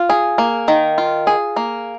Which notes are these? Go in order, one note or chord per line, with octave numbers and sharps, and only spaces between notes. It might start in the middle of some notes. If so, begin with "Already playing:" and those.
Already playing: F4
G#4
A#3
D#3
F4
G#4
A#3